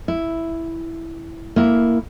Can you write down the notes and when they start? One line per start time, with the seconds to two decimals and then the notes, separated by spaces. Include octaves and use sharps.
0.08 E4
1.56 A#3 E4